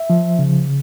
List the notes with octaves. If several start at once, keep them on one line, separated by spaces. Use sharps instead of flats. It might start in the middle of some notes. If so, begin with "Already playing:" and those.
Already playing: E5
F3
C#3